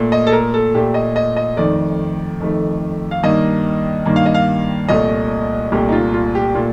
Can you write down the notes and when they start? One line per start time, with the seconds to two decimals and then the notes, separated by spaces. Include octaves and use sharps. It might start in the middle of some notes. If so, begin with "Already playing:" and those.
Already playing: A#2 A3
0.12 D#5
0.27 A4
0.32 A#4
0.54 A4
0.74 A#2 A3 G4
0.94 D#5
1.16 D#5
1.36 D#5
1.56 F2 D#3 A3 D5
2.40 F2 D#3 A3
3.11 F5
3.23 G2 D#3 A#3 D#5
4.06 G2 D#3 A#3
4.16 F5
4.26 D#5
4.34 F5
4.89 C2 A#2 A3 D#5
5.72 C2 A#2 A3 G4
5.88 D#4
5.92 F4
6.14 F4
6.35 G4
6.55 A#2 A3 F4